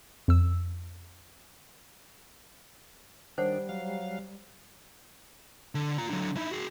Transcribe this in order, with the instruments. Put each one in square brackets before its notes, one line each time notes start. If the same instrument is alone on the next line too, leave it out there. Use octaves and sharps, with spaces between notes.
[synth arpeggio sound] F2 E6
[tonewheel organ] D#3 D4 [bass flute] G3 [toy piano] C5 C#5 F#5
[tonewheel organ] F#3 F5
[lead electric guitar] D3
F4 A#5
D3 F#3
D#4 E4
F#4 G#4